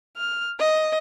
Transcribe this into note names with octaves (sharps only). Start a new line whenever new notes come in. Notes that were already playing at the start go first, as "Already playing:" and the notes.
F6
D#5